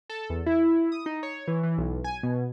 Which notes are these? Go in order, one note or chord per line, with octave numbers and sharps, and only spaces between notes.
A4
E2
E4
D#6
D#4
C#5
E3
E3
B1
G#5
B2